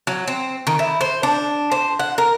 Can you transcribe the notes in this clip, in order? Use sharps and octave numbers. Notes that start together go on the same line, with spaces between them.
F#3
C4
D#3
E4
C5
D4
C5
F#5
A#4